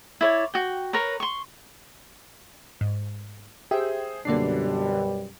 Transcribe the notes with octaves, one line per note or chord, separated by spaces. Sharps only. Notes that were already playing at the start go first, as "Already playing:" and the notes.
E4 C#5 D5
F#4 G5
A#4 B4 C#5 A#5
C6 C#6
G#2
G4 G#4 C5 E5 G5
F#2 B2 D3 G3 A#3 D4 D5 C7